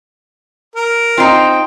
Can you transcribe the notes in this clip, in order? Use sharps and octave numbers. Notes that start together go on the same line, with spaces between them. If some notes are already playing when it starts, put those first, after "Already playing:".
A#4
C4 D#4 F4 G5 C7